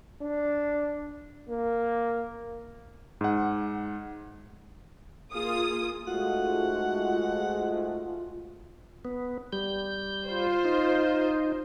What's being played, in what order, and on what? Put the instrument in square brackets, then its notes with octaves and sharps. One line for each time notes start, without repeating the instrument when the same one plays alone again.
[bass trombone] D4
A#3
[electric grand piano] G#2 F#5
[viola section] A#3 F4 G#4 [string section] D#6
[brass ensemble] G#2 G#3 A3 [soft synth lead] F4 [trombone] F#4 [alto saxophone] F#5
[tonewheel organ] B3
G3 G6
[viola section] F4 C5
[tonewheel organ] D#4